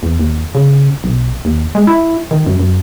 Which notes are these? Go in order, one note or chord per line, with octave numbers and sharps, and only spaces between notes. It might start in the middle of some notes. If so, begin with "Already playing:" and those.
E2
D#2
C#3
B1
D#2
G#3
E4
D#3
F#2
F#2